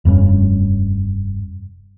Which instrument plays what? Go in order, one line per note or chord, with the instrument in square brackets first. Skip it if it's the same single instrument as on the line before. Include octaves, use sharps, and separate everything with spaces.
[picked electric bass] F1 G2 A#2 C#4